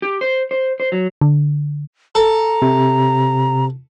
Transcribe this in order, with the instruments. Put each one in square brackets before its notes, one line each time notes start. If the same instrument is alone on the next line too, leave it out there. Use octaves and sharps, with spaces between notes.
[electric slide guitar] G4
C5
C5
C5
F#3
[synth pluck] D3
[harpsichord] A4 [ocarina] A#5
[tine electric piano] C3